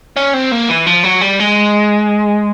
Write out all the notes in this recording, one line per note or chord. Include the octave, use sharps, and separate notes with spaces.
C#4
C4
A#3
E3
F3
F#3
G3
G#3